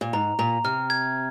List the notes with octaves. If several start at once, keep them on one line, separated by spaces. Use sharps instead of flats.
A#2
G#2 A#5
A#2 A#5
C3 F6
G#6